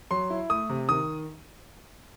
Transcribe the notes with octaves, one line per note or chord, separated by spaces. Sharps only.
F#3 C6
E4
A3 D#6
C3
D#3 D#6